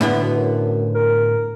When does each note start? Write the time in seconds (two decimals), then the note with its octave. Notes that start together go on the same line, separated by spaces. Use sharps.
0.01 A2 D3 B3
0.22 B2
0.37 F#2
0.95 A#4